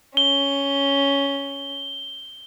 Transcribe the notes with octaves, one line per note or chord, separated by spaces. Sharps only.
C#4 G7